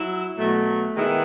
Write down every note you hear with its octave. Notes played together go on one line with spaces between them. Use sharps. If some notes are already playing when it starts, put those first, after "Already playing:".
Already playing: F#3 E4
B2 F#3 A3
D#3 G#3 B3 E4